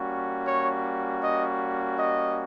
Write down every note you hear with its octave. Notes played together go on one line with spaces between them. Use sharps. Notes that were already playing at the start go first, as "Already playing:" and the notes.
Already playing: G3 A#3 C#4 F#4
C#5
D#5
D#5